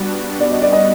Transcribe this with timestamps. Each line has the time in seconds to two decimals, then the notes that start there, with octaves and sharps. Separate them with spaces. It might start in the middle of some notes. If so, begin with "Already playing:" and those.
Already playing: G3 B3 D4 F#4
0.40 D5
0.51 D#5
0.62 D5
0.73 D#5